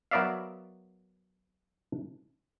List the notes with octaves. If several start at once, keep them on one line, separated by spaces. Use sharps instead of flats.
F#3 B3 A#4 D5 E5 F5